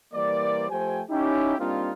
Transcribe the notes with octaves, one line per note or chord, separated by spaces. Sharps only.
E3 G3 A#3 A#4 C5 D5
F3 A3 G4 C5 G5 G#5
C#4 D#4 E4 G4
G3 A#3 C4 D4 D#4 F4